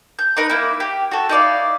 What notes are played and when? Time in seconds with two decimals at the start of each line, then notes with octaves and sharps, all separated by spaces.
0.19 G6
0.37 D#4 A#4 B4
0.49 A#3 E4
0.80 G4
1.11 F#4 A4
1.29 D#4 E4 D5 F5